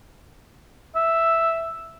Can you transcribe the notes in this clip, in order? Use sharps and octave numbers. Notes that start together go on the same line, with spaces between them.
E5